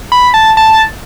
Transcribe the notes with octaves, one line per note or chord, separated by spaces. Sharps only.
B5
A5
A5